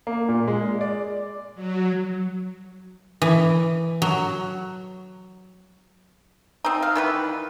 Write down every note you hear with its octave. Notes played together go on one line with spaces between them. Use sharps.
A#3
A#2
G#3
D5
F#3
E3
F#3
C4 D#4
F5
D#3 E3 B4